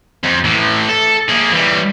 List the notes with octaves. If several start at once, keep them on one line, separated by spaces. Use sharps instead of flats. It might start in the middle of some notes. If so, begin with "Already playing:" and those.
F2
A2 E3
A4
A#3 G#4
E3 G3